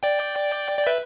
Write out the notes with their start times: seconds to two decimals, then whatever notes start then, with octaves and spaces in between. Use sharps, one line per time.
0.03 D5 G5
0.78 D5
0.86 B4 E5